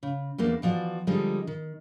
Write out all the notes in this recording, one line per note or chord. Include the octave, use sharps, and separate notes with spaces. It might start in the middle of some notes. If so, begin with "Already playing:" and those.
C#3
E2 A3 A#3 D4
E3 F3 F#4 D5
D3 F3 G3 G#3 D#4
D#3